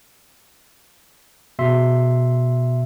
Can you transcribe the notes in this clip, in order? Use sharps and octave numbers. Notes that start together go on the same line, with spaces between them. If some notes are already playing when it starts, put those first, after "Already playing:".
B2 E5 C6